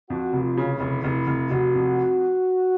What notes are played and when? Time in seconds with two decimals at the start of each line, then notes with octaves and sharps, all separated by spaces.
0.10 F2 F#4
0.33 F1
0.41 F4
0.57 C#3
0.73 E4
0.80 F1
1.03 F1 E4
1.27 F1
1.50 F1 F#4
1.75 F2